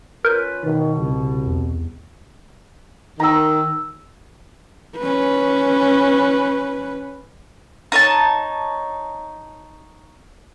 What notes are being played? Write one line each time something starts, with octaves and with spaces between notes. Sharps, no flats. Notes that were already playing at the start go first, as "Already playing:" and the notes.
C#4 F4 A#4 B4 G6
B2 D#3
C2 C#3
E2
D#3 A#5 E6
C#4 B4
D#4 C#5 A5